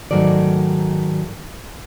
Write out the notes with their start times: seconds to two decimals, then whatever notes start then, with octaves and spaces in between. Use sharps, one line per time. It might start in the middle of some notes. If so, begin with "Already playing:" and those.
0.11 G#2 D#3 F#3 A3 D5